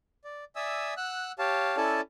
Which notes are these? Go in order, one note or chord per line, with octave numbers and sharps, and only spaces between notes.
D5
D5 E5 G#5 D#6 E6
F#5 E6 F#6
G4 C#5 F5 A5
C#4 E4 A4 D5 G#5 A5